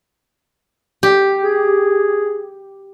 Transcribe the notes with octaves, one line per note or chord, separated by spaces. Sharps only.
G4
G#4